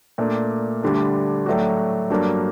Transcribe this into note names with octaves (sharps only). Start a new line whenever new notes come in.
A#2 A3 D4
D2 D3 G3 D4
A2 F#3 A3 D4 F#4
G2 F#3 A#3 D4 A4